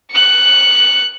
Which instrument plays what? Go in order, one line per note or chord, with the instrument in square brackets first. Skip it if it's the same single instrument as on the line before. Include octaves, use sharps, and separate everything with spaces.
[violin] F#6 C#7